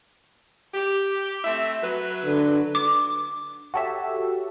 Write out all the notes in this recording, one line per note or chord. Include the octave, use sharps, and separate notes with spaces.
G4
A3 C4 E5
F#3 B4
D3
D6
F#4 G4 A4 C#5 E5